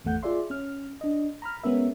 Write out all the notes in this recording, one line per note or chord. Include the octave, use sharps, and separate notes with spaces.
G#1 E2 A3 F#5 G6
F4 G#4 D5 E5 C6
C#4 F6
D4 D#5
A#5 B5 F6
G#3 B3 C#4 A#4 E5